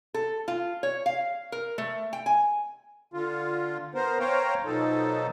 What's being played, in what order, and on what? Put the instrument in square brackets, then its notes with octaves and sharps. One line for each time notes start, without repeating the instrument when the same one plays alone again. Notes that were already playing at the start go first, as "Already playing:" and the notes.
[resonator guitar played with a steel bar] A4
F4
C#5
F5
A#4
A3
G5
G#5
[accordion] D3 F4
B3 A#4 C5
C5 C#5 F5 G5 A#5
B2 F3 F#3 D#4 A4